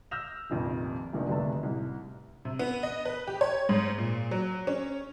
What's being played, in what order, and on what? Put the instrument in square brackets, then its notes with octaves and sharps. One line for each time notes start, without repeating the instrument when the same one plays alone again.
[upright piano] E6 F6 G6 A#6 E7 F7
F1 A#1 F2 D#3
F1 A#1 A#2 D#3 D4
F1 D3 D#3 A3 A5
C2 A2
[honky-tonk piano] C3
B3
D#5
B4
G4
C#5
G#2
A#2
F#3
C#4